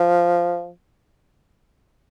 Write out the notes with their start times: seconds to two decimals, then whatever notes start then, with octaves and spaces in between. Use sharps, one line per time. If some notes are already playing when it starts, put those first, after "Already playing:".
Already playing: F3